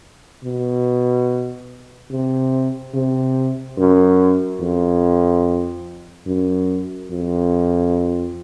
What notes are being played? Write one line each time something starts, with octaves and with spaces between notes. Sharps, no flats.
B2
C3
C3
F#2
F2
F#2
F2